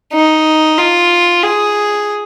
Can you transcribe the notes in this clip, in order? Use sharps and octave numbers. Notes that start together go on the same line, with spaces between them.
D#4
F4
G#4